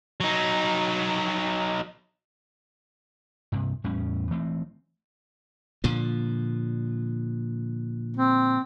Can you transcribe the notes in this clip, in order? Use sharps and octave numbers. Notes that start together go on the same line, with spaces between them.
F#3 D#4
G2 C3
E2 A2 G3 C#4
E3 A3 C4
A#2 D3 F3
C4